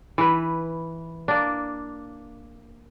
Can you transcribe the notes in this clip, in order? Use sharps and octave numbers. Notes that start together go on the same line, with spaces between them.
E3 B4
A#3 D4